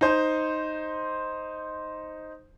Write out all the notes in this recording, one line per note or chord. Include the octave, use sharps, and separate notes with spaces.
D#4 C5